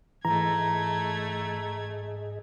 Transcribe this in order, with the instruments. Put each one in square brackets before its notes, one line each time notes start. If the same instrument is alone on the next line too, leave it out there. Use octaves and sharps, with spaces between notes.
[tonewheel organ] G#2 G#4 D#5 [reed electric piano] E3 [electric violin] A3 G#6 [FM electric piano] A#5